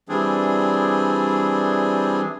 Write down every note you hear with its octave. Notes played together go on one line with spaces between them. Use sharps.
E3 G3 C4 D4 G#4